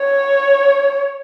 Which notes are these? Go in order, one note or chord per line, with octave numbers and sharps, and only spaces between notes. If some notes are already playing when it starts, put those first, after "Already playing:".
Already playing: C#5